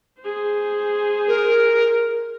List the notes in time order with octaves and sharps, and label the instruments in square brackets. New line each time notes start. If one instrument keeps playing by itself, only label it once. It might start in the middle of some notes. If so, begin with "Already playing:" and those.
[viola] G#4 C5
[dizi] A#4